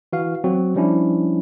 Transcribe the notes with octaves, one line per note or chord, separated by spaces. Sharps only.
E3 F#4 F5
F#3 C4 F#4
F3 G3 C#4 D4 E4